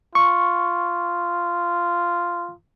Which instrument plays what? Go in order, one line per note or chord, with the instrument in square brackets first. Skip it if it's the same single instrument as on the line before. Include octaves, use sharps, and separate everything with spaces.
[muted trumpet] F4 [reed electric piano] C#6